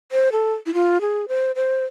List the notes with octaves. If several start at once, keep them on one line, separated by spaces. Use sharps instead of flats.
C5
A4
E4
F4
G#4
C5
C5